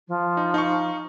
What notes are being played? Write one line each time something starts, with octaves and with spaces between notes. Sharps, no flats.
F3
D#4
D#4 F5 C#6